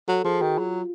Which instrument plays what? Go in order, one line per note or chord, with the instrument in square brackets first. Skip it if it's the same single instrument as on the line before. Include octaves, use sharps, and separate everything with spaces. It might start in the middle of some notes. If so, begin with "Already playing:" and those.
[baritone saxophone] F#3 [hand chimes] A4
[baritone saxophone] F3 [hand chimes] G#4
[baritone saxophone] D#3 [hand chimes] F#4
[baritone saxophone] F#3 [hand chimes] F4